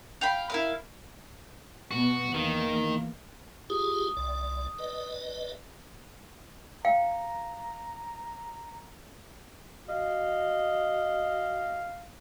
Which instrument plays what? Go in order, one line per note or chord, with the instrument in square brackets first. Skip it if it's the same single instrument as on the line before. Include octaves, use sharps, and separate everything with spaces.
[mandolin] F5 G5 B5
E4 A#4 F5
[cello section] B2 B3 [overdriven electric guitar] F#4
[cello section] E2 A#3 [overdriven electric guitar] D#3
[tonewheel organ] F4 G4 G#4 [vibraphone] D#6
[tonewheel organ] C2 D5
B4 D5 D#5
[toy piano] F5 G5 [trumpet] A#5
[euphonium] F#4 [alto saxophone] D#5 [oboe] F5